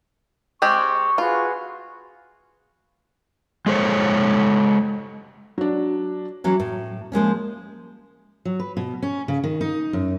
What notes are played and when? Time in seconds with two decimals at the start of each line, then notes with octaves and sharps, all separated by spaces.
0.62 G#3 C4 G4 C#6
1.18 F4 F#4 G#4 B4
3.66 G#3 A4 C5 C#5
5.58 F#3 D4
6.44 E3 F#3 C#4
6.60 A2
7.12 F3 G#3 A#3 C#4
8.45 F#3
8.60 B4
8.77 B2
9.03 C#4
9.28 C#3
9.44 D#3
9.61 D#4
9.93 F#2